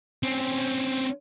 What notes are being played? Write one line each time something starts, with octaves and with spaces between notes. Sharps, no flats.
C4 C#4